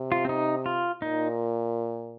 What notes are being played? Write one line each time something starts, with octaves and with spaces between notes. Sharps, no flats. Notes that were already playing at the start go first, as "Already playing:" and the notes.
Already playing: C3
F4
C4
D#4
F4
A#2 D#4